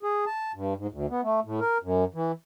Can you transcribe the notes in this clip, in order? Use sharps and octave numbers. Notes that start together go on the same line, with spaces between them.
G#4
A5
G2
G#2
D2
B3
A3
A2
A#4
F#2
E3